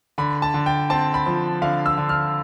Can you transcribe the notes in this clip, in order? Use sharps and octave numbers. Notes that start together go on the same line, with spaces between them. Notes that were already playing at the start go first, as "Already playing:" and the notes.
D3 B5
A5
D3
G5
C4 A5
B5
F3
D3 F5
E6
D3
F6